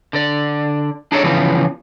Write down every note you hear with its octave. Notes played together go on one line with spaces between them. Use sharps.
D3 D5
D4 D#4 G#4 A4 C#5 D5
C#3 E3 F3 G3 B3